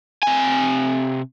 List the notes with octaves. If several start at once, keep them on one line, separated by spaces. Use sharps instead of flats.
C3 G#5